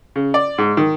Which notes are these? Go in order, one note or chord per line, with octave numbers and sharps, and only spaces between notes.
C#3
D5
G#2
D#3